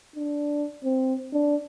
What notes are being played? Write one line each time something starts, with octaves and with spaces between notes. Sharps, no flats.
D4
C4
D4